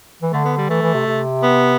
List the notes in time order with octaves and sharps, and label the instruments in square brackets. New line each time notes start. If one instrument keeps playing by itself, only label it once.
[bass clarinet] E3
[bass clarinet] D3 [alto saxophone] A3
[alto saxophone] B3
G3
[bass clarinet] E3 [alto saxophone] A3
[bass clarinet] E3
C3
C3
[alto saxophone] B3